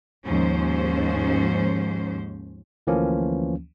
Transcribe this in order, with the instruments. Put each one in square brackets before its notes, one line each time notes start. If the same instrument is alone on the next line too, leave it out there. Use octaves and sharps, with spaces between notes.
[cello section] D#2 G#2 F3 C#4 C5
[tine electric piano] D2 E3 F3 A#3 C#4